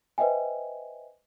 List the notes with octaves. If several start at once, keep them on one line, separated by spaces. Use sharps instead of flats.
B4 C5 D#5 E5 G5 G#5